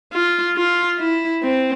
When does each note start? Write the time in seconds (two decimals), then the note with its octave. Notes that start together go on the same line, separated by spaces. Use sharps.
0.13 F4
0.57 F4
0.99 E4
1.43 C4